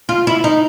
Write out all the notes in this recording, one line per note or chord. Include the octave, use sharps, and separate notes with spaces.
F4
E4
D#4